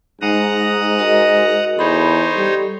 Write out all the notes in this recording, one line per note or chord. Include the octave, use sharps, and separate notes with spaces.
G#2 G#3 D#4 F#5 A#5 D#6
F#4 A#4 D#5
E2 D#4 A4 C5 C#5 B5
G3 A4